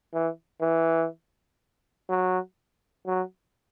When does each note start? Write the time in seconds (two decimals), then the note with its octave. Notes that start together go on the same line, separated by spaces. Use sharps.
0.14 E3
0.62 E3
2.09 F#3
3.07 F#3